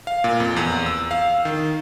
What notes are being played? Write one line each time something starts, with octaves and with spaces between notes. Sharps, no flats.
F5
A#2
F2
E2
E6
F5
D#3